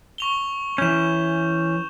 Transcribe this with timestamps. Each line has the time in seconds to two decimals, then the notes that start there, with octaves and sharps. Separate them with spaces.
0.18 C#6 F7 G7
0.78 E3 C#4 G6 E7